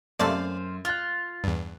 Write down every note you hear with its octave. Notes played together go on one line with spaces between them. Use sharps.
F#2 C3 A3 A#3 C5 D5 F5
F4 F6 F#6
E2 G2